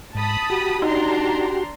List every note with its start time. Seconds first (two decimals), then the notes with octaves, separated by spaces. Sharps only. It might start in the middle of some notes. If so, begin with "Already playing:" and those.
0.15 G#2 A5 B5 D#6
0.50 F#4 G4
0.82 D4 D#4 A#5 C6